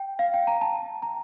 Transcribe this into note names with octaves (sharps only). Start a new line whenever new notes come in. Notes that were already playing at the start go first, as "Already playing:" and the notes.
Already playing: G5
F5
G5
A#5
A5
A#5